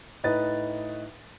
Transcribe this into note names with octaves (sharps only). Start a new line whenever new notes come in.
A2 D#4 B4 A6